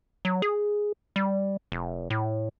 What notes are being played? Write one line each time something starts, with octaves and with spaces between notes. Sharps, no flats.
F#3
G#4
G3
F1
A2